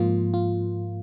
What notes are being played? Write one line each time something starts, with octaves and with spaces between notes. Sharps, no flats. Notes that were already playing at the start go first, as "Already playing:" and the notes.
Already playing: G#2 F3 A#3 F4
F4